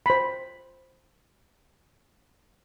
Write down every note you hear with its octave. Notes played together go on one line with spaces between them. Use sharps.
C5 B5